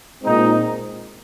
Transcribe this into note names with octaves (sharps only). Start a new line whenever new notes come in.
A#2 G#3 C4 D#4